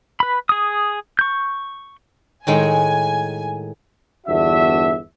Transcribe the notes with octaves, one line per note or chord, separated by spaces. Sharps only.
B4 B5
G#4 D#6
C#6 G6
A2 D#3 G#3 G#5
G1 E2 D4 F#4 E5